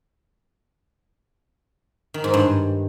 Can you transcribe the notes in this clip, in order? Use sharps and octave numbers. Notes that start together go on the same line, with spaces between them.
D#3
G#2
G2